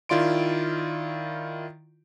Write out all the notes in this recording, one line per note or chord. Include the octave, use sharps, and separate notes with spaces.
D#3 E4 F4 D5 C6 D7